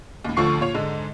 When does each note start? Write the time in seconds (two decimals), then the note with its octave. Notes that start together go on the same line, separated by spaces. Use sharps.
0.25 D#2 A2
0.37 D2 D3 F3 F4 C#6 C7
0.60 A#2 F4 C#5 F7
0.74 G#2 D3 G#3